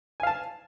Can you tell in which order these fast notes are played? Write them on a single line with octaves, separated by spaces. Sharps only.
G#5 F5 A5